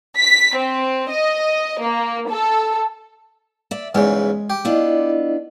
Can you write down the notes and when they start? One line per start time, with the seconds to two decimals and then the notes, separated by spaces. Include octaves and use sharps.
0.18 B6
0.56 C4
1.11 D#5
1.81 A#3
2.30 A4
3.71 D5 E5
3.95 E2 G#2 C#3 G#3
4.50 G4
4.65 B3 D4 E4 F4 D5 D#5